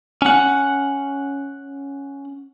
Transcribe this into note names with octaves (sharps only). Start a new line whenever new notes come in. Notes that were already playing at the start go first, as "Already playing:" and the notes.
C#4 F#5